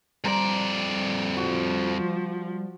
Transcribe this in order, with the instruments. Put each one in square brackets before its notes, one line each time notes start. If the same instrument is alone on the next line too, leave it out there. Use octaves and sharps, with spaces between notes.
[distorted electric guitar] F2 D5 [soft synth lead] G3 [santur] C5 A#5
[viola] F3 [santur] F#4